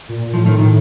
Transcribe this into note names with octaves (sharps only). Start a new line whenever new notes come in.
A#2
A2 F3
D#3
A2 D#3